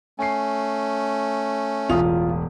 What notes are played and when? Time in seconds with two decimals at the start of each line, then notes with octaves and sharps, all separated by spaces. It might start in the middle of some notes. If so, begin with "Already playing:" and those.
0.19 A3 C#4 G#5 C7
1.89 E1 A1 F4 D#6